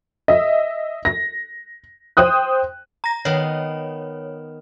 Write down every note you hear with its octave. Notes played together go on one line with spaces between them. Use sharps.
D#5 E5
A#6
C5 G5 D#6 F#6
A#5 A#6
D#3 B3 C#5